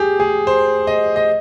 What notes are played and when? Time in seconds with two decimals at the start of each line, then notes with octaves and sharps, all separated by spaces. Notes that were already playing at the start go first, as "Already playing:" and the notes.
Already playing: G4 G#4
0.20 G#4
0.47 C5
0.87 D#5
1.16 D#5